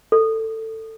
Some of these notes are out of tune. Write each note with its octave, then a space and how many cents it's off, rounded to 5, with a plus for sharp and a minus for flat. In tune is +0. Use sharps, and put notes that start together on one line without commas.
A4 +15